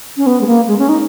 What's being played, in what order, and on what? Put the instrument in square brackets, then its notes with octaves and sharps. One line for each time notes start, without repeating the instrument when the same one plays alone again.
[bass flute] C#4
B3
G#3
A#3
G#3
C#4
D#4